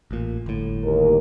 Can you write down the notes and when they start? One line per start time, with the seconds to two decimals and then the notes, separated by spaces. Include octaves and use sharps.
0.11 A1 A#2
0.46 G1 A2
0.84 D#2 A#4